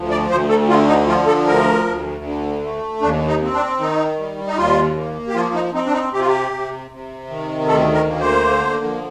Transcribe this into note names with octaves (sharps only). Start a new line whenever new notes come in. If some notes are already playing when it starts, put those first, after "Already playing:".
Already playing: D2 F3
D5
D2 C5
A4
D3 F4
D#4
F3 F4
A4
D2 A#4
D2
D3
A3
D#2 D4
D#4
C4
D4
D#3 D#4
G3
D#4
D#2 F4
A#3
G4
F3 F4
D#4
C4 D#4
D4
D#4
C3 G4
F4
G4
C3
C3
D#3
D2 A4
A#4
A#3
C5
D3
F3